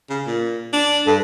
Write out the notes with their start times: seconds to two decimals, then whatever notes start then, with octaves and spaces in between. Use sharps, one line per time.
0.10 C#3
0.27 A#2
0.73 D4
1.07 G2 A4